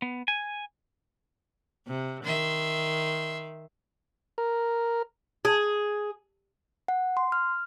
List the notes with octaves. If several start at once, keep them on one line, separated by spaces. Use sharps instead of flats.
B3
G#5
C3
D#3 E5 C6
A#4
G#4
F#5
C6
F6